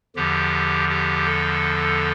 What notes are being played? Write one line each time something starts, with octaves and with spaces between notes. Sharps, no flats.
E2 D3 F3 G4
G4
A4